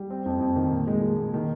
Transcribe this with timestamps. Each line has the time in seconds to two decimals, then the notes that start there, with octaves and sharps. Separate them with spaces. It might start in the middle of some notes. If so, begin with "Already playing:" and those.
Already playing: G3
0.10 C4
0.26 F2
0.40 F2
0.56 D#3
0.71 A#2
0.87 G#3
1.02 G#3
1.18 A#2
1.34 D#3